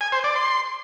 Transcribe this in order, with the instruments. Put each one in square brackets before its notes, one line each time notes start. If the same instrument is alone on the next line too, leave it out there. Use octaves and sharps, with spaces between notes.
[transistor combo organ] G#5
C5
D5
C6